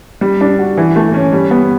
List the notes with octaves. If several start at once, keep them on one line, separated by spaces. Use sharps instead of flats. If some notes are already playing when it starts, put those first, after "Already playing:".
G3
D4
F#4
E3
A3
C#4
G3
B3